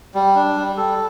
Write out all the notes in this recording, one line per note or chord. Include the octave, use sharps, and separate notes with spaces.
G3
D4
G3
G3 A4